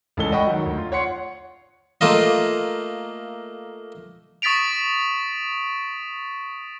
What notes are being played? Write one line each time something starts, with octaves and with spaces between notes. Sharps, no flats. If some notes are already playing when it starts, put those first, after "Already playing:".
C#2 E3 G#3 A4 G7
D#5 F#5 G5 B5 C#6
D#3 F#3
D2
F4
C#5 F#5 C6 C#7
A3 A#3 F4 D#5
C#6 D#6 A6 B6 D7 F7